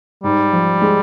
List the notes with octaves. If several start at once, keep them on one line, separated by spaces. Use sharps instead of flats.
G#2 G3
F3
G#3